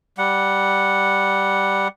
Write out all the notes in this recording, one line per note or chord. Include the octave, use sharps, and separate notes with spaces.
G3 F#5